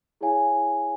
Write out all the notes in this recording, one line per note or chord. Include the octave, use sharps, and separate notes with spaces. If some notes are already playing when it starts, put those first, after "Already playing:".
E4 G#4 C#5 F5 G#5